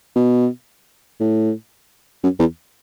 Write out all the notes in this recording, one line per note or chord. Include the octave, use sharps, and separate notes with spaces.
B2
A2
F#2
E2